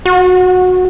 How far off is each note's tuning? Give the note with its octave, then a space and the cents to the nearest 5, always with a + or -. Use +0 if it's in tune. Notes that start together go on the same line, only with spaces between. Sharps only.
F#4 -15